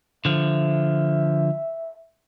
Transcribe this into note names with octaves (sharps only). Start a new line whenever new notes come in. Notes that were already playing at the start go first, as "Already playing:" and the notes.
D3 F3 E5